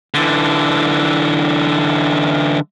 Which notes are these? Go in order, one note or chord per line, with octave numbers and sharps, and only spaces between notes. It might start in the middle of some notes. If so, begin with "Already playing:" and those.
D3 E3